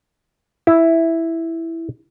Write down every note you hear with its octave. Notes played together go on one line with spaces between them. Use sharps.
E4